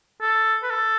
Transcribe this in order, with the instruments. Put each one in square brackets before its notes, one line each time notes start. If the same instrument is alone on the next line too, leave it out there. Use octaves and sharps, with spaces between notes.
[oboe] A4
B4
A4